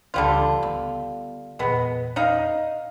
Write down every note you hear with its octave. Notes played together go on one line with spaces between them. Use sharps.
C#2 D3 E3 G3 F4
B3
E2 A#2 G#3 B3
D#4 D#5 F5